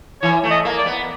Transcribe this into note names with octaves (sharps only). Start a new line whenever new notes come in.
E3 C#5
A3
D#5
A#3
D5
B3